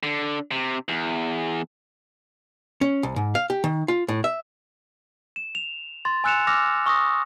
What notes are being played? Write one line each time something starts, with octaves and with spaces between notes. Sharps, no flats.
D3
C3
E2
C#4
C2
G#2
F5
G4
D#3
F4
A2
E5
E7
F7
C6 A6
G#5 E6 F#6 C#7 E7 F7
D6 E6 F6 A#6 F7
C#6 D#6 A#6